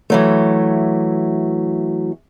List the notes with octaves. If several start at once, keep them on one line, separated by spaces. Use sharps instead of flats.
E3 F#3 A3